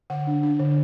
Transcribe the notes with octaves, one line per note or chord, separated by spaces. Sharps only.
D3 F#5
D4
D4
D3